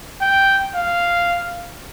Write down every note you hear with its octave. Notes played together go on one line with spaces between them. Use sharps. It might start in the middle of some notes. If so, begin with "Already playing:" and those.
G5
F5